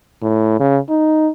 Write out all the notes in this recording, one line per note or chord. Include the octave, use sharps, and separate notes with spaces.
A2
C#3
D#4